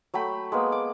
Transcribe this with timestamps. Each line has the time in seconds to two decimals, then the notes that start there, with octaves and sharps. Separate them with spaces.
0.14 F#3 A3 G5 B5
0.52 G#3 A#3 B3
0.72 D6